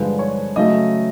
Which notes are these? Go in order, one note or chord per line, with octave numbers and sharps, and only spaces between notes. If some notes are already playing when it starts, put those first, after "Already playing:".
Already playing: G2 D3 F3 G#3 B4
C#5
C#3 F#3 A3 D#5